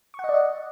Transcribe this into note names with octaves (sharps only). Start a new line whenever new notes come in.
C#6
F#5
D#5
D5
D#5